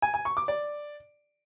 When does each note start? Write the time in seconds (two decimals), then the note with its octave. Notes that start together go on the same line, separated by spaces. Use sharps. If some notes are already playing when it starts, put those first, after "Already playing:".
0.02 G#5
0.14 G#5
0.25 C#6
0.37 D6
0.48 D5